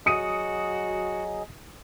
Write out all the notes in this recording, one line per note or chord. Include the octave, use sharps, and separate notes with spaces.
F#3 F#4 G#4 D#5 D#6 C#7 D#7